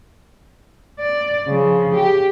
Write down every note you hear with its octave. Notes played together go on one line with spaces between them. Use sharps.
D5
C#3 F3
G4